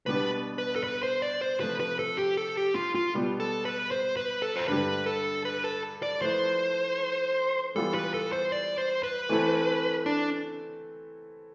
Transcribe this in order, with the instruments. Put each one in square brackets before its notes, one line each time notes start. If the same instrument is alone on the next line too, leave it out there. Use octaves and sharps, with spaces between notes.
[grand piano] B2 G3 B3 D4 [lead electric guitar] B4
[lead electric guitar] B4
A4
B4
C5
D5
C5
[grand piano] C3 F3 A3 [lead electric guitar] B4
[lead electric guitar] B4
A4
G4
A4
G4
F4
F4
[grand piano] B2 G3 B3
[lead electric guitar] A4
B4
C5
B4
A4
C5
[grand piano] G2 D3 G3 [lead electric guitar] B4
[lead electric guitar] A4
B4
A4
D5
[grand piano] F3 A3 E4 B4 [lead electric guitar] C5
[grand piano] E3 G3 B3 F4 [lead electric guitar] A4
[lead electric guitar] B4
A4
C5
D5
C5
B4
[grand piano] E3 A3 C4 E4 A4
[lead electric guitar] D4